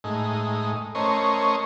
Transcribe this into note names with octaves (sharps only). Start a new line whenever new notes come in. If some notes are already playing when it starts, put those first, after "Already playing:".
A2 G#3 D#4
A3 C#4 A#4 C5 C#5 D#5